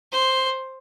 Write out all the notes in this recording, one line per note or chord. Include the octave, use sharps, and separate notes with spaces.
C5